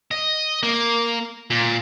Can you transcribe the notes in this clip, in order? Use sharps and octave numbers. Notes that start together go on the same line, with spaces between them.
D#5
A#3
A#2